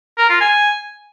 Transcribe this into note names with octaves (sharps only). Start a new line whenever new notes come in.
A#4
F4
G#5